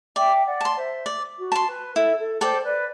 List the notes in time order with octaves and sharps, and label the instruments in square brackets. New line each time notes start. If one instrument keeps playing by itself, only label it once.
[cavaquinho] D5 [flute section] E5 G5
[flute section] D5 F#5
[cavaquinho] A5 C6
[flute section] C5 E5
[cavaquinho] D5
[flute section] F#4
[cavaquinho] A5 C6
[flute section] B4
[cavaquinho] E4 [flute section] A4
[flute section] A4
[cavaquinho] A4 D5 G5 [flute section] C5
[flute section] B4 D5